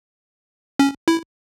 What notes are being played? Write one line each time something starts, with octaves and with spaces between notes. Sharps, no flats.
C#4
E4